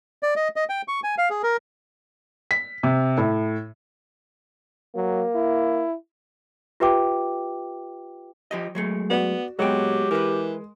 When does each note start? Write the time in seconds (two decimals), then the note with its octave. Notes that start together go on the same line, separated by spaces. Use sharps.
0.23 D5
0.36 D#5
0.56 D#5
0.69 G5
0.88 C#6
1.04 G#5
1.18 F5
1.30 G#4
1.43 A#4
2.51 B6
2.83 C3
3.18 A2
4.96 F#3 A#3
5.35 E4
6.80 F4 G4 B4 E5 G5 D6
8.51 F3 G4 D#5
8.75 F#3 G#3 A3
9.10 B3 F#4 D5
9.59 A#2 F#3 G#3 B3 G4 G5
10.11 E3 A#4 B4